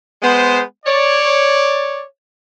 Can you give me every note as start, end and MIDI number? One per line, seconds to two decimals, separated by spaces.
0.22 0.60 56
0.22 0.60 59
0.22 0.60 72
0.86 2.03 73
0.86 2.03 74